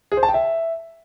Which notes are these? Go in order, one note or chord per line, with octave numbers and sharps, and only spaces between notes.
G#4
C5
A5
G5
E5